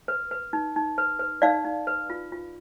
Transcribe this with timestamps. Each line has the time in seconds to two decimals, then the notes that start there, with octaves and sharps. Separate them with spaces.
0.08 B4
0.31 B4
0.53 D#4
0.76 D#4
0.98 B4
1.19 B4
1.42 D#4 D5 F5
1.64 D#4
1.87 B4
2.10 F4
2.32 F4